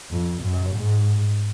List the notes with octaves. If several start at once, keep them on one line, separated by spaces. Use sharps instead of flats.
F2
F#2
G#2